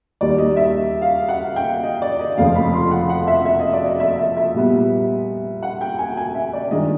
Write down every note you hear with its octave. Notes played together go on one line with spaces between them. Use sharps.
D#2 D#3 G3 D5
D#5
E5
F5
F#5
G5
D#5
D5
D#5
F1 F2 C#3 F3 F5
B5
C6
F#5
F#5
E5
E5
D#5
D5
D#5
E5
E5
E5
A#2 G3 B3
F#5
G5
G#5
G#5
E5
D5
G2 D#3 G#3 D#5